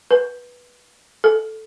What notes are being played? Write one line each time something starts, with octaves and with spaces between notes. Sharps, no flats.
B4
A4